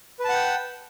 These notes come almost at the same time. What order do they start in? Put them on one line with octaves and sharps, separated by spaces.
B4 A5 F#5 G5